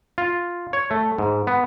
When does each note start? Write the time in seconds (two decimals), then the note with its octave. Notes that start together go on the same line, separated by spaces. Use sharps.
0.18 F4
0.73 C#5
0.91 A3
1.18 G#2
1.47 B3